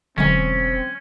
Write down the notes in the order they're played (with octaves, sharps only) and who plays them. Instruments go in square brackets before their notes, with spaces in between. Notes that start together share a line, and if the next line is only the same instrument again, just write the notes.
[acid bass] E1 [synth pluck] D3 F#3 G#3 [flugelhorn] C4 [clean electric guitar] C#4